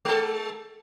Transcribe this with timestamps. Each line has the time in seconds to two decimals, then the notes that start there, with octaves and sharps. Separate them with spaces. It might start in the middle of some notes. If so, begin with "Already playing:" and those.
0.05 G#3 A4